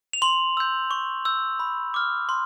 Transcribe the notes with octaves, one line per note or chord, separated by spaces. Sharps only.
F7
C6 F#7
E6 G6
C#6
E6 G6
B5
D6 F6
C6